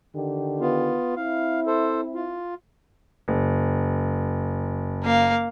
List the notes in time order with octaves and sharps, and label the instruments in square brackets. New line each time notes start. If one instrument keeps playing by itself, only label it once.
[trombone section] D3 D#3 G4
[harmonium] B3 F4
[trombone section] C4 E4 [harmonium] F5
[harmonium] A4 C5
F4
[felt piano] F#1
[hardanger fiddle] A#3 F5